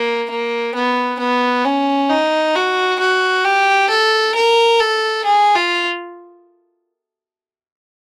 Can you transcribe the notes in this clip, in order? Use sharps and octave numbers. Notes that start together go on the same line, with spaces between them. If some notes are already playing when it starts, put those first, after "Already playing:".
Already playing: A#3
A#3
B3
B3
C#4
D#4
F#4
F#4
G4
A4
A#4
A4
G#4
F4